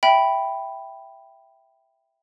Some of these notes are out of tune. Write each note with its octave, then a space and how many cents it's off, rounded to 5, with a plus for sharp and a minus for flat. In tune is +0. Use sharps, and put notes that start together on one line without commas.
E5 +0 G5 +0 B5 +0